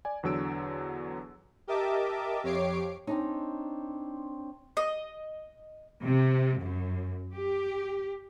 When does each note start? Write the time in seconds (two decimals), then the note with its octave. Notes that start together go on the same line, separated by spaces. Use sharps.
0.05 D5 G#5
0.23 E2 D3 F#3 E6 D7
1.67 G4 A#4 D#5 E5 A5 D6
2.43 F2 G4 C#5 D6 C7 D7
3.07 C4 D4 D#4 C#5
4.77 D#5
6.04 C3
6.60 F#2
7.33 G4